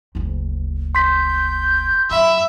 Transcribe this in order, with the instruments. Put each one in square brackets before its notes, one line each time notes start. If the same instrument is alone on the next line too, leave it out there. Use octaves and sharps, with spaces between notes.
[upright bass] F#1 D2
[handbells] C6 B6 [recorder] G6
[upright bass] F#2 [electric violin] E5 [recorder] B5